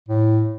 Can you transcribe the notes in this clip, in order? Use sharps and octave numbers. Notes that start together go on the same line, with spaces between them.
A2